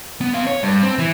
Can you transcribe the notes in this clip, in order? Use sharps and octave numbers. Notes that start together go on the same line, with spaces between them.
B3
C4 F5
C#5
G2
C4
E3